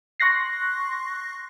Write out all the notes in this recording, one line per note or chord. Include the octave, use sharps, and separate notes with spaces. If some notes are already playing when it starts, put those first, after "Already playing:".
C6 C#6 F#6 A#6 C7